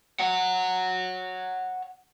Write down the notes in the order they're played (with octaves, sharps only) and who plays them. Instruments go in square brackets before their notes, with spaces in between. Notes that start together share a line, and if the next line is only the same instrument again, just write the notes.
[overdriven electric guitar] C#5 F#5